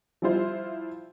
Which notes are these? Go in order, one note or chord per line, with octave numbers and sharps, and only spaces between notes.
F3 G3 E4 F4 C5